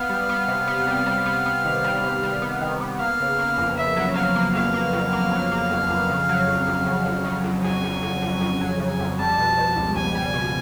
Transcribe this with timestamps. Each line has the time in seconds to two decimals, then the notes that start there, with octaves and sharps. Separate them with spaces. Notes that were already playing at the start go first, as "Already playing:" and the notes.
Already playing: B3 F5
0.09 G3
0.29 B3
0.48 C3
0.67 B3
0.87 G3
1.06 G3
1.26 B3
1.46 B3
1.65 D#3
1.84 G3
2.03 C3
2.23 G3
2.42 B3
2.61 D#3
2.80 B3
2.99 A#3 F5
3.20 C#3
3.39 A#3
3.58 F2
3.77 C#3 E5
3.96 F#3
4.15 F#3 F5
4.36 A#3
4.55 F2 F5
4.74 A#3
4.93 F2
5.13 A#3
5.31 F#3
5.52 A#3
5.71 F2
5.90 F2
6.10 C#3
6.29 F#3
6.47 F2
6.67 F2
6.86 C#3
7.06 F2
7.25 C#3
7.44 F2
7.64 F2 G#5
7.84 F2
8.02 F2
8.22 F2
8.41 F2
8.61 F#3
8.80 C#3
8.99 F2
9.19 G3 A5
9.38 B2
9.58 B2
9.76 C#2
9.95 C#2 G#5
10.15 G3
10.34 B2